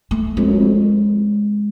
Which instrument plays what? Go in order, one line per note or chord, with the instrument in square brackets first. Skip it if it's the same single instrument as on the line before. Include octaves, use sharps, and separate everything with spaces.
[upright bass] A3
[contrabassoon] F2 [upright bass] G#3
[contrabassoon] F#2
F2